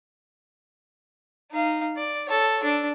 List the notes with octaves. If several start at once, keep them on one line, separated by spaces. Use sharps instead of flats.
D#4 F5
D5
A4 C#5
D4